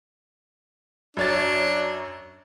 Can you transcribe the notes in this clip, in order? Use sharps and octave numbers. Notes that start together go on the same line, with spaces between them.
F#2 D4 C#5 A6